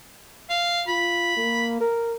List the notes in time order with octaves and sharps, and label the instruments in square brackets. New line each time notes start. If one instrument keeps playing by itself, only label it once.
[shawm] F5
[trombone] F4 [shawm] B5
[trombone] A#3
A#4